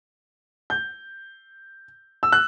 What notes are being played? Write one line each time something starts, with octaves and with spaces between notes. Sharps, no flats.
G6
E6
F#6